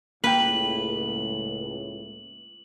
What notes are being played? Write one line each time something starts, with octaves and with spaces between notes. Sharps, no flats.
C#2 A2 A#3 B4 G5 F#7